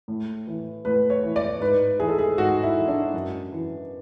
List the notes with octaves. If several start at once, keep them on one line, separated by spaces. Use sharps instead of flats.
A2
E3
A2 B4
C#5
E3
D5
G#2 B4
E3 G#4
A4
G#4
G#2 F#4
E4
E3
D4
F#2
E3